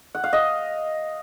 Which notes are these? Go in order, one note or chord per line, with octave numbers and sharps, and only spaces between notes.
F#5
F5
D#5